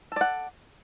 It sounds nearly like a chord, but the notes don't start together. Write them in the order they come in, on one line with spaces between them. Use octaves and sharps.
A4 D5 F#5